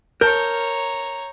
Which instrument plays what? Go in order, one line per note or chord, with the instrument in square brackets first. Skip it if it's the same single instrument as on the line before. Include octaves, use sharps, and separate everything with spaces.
[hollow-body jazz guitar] A#4 A5 [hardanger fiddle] C#5 A#5 [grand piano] G6